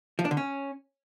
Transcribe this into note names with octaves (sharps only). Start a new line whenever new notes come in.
F3
D4
D3
C#4